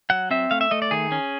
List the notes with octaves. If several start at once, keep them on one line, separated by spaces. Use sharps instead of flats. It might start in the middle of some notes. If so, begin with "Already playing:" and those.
F#3 F#5
C4 E5
A3 F5
E5
A3 D#5
D5
D#3 G#4
C#4